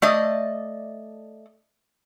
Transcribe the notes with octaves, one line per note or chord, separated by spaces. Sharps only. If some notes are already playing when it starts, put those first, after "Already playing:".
A3 D5 D#5